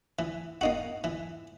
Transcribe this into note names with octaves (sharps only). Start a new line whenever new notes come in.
E3
A#3 D#4 F#4
E3